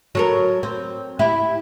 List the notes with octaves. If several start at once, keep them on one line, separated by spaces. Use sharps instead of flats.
F#3 A4 A#4
C4
E4 G4